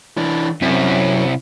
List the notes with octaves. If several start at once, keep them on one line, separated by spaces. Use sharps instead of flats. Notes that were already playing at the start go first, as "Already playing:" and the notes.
E3 D4
F#2 C3 C4 E4